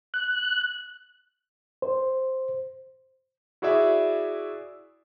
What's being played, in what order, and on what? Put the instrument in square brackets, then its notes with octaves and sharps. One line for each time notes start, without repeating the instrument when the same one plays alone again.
[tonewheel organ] F#6
[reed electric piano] C5
[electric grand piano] E4 F#4 G#4 D5 E5